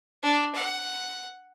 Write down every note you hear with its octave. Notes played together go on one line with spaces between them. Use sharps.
D4
F#5